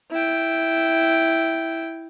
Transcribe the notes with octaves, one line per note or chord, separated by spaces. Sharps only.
E4 G5